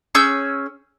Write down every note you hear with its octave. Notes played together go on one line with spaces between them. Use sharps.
C#4 G#4 E6 G6